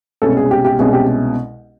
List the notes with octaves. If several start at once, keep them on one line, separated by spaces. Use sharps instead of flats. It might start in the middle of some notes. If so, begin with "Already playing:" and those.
C2 B2 G#3 C#4 A4
G#4
G4
G4
C2 B2 G#3 C#4 G#4
G4